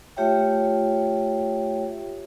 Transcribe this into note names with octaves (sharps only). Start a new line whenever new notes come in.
A3 F4 G4 C#5 E5 G5